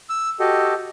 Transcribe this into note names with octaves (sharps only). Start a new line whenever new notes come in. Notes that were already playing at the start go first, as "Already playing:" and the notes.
E6
F#4 G4 A4 D#5